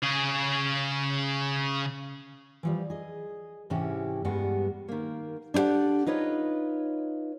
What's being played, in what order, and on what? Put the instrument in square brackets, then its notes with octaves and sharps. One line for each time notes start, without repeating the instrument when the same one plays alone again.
[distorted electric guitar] C#3 G#4
[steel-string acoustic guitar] E3 F3 G3
G#4 D#5
G#2 C3 E3 C#4 E4 G4
G2 G3 G#3 B3 F#4
D#3 A#3
D4 E4 G4 A4 F#5
D#4 F4 B4 C#5 D#5